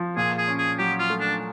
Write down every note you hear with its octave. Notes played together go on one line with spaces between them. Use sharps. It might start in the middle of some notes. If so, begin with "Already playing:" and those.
Already playing: F3
A#2 G#4
G#4
C#4
G#4
F#3 G4
F4
A3
D4